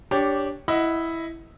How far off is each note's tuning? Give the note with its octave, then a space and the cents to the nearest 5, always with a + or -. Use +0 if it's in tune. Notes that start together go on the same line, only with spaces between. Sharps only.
D4 -10 G4 +0 C#5 +0
E4 +0 D#5 +20 F#5 +0